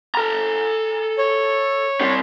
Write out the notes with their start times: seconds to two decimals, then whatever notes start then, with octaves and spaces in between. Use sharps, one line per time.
0.15 A4 A#5
1.18 C#5
2.00 G3 C4